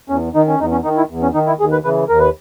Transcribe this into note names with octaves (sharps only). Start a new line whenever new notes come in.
E2 C#4
D#3 D#4
C#4
E2 D#4
C#4
D#3 D#4
E4
E2
C#4
D#3 D#4
E4
D#2 G#4
B4
C#3 E3 B4
D#2 A#4
B4